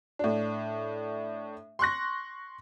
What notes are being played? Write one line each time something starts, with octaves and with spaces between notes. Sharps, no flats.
A2 D4
C6 C#6 F#6 A#6